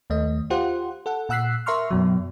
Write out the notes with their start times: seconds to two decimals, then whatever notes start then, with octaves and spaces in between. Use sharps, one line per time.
0.10 D#2 A3 D#5
0.50 F4 G4 C5 F#5
1.06 A4 F#5
1.29 A#2 F#5 E6 F#6 B6 C7
1.66 A#4 E5 A#5 C6 C#6 F6
1.91 F#2 B2 F#3